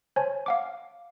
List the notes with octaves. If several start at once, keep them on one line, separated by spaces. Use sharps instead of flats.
C5 C#5 G#5 A5
F5 F#5 D6